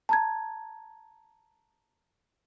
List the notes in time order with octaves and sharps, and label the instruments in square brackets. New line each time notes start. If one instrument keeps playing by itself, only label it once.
[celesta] A5 A#5 G#6